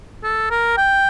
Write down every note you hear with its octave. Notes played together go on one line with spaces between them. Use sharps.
A4
A#4
G5